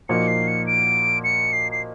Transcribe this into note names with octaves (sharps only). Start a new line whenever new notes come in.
A#2 F3 A#3 D#4 F#4 C#7
C7
C#7
D7
C#7
C7
C7